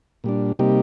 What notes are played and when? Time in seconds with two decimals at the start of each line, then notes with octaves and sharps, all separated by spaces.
0.24 A#2 G3 D4
0.59 C3 G3 A#3 D#4 G4